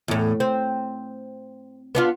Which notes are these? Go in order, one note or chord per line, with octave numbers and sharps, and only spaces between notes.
E2 A2
C4
B3 D4 F4